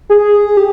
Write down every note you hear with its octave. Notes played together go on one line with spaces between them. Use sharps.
G#4
G4